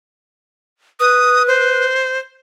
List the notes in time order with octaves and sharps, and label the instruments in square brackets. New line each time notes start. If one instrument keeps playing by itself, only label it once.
[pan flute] B4 [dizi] D#6
[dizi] C5